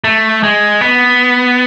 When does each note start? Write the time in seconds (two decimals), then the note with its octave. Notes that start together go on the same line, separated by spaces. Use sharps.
0.04 A3
0.43 G#3
0.81 B3